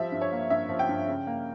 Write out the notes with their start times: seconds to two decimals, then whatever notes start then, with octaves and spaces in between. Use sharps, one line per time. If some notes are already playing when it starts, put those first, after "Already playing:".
Already playing: F3 G3 E5
0.12 G2
0.21 C#5
0.32 A#3
0.50 G2 E5
0.69 F3
0.79 G5
0.89 G2
1.08 C#3
1.27 A#3